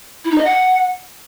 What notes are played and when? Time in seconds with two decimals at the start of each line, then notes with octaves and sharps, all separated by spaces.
0.24 E4
0.31 D#4
0.38 D#5
0.44 F#5